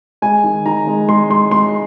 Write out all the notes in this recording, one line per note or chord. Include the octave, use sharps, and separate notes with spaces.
G#3 G#5
D#3
D#3 A#5
G#3
G#3 C6
G#3 C6
G#3 C6